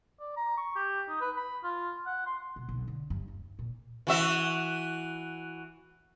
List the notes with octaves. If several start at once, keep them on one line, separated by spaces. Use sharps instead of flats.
D5
A#5
C#6
G4
D#4
B4
B5
F4
F#5
C6
B2
B1
D3
G2
D#2
A#2
E3 F#4 E5